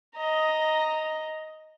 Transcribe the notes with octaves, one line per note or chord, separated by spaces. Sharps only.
D#5 A#5